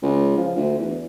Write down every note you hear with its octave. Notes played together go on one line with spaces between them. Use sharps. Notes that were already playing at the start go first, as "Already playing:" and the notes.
C#2
F3
D2
E2